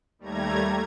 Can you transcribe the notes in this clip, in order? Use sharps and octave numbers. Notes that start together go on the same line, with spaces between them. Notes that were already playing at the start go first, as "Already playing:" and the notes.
D#2 G3 A3 A#5 G#6